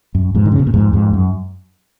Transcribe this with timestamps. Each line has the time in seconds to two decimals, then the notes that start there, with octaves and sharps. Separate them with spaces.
0.15 F#2
0.35 F2 G#2
0.46 D#3
0.52 C#3
0.59 B2
0.67 A#2
0.74 F2 G#2
0.93 F2 G#2
1.14 F#2